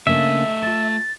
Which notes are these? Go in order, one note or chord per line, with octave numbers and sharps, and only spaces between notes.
C#3 A3 A#3 D4 D#5 E5
F4 A5 A6